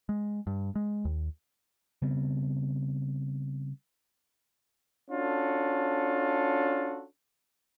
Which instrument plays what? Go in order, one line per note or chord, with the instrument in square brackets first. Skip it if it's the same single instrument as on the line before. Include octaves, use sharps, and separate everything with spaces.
[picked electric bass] G#3
G2
G#3
D#2
C#3 G3 B3 C4
[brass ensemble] C#4 D4 F4 F#4 A4